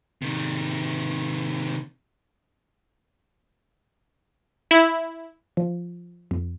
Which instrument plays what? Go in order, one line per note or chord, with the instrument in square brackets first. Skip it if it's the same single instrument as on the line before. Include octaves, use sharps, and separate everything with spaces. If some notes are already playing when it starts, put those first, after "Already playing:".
[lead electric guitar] C3 D#3
[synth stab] E4
[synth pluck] F3
F2